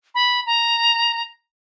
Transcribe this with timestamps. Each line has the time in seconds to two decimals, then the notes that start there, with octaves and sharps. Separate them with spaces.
0.15 B5
0.46 A#5